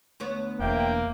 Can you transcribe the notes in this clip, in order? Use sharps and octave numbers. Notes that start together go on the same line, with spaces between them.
D2 B3 C#5
E1 A#3 C5 E5 G5